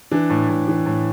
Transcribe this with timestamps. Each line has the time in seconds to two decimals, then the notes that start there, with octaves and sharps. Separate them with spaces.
0.11 E3 D4
0.30 A2
0.49 A2
0.68 E3
0.86 A2